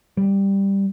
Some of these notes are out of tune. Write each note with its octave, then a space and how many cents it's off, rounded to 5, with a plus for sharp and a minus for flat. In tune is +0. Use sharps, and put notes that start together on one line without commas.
G3 +5